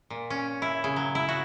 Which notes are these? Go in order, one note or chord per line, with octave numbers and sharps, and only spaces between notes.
A#2
C#4
E4
C#3
F#3
E4
F#4